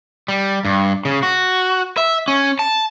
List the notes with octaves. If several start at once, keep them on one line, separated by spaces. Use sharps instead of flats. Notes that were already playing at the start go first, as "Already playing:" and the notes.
G3
G2
C#3
F#4
E5
C#4
A5